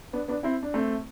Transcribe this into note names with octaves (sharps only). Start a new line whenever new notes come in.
B3 D4
B3 D4
C4 E4
D4
A3 C4